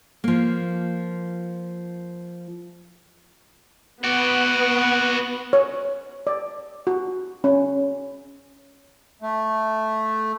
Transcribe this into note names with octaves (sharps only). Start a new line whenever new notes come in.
F3 A#3
B3 F#4 D5 F#5
C#5
D5
F#4
C#4
A3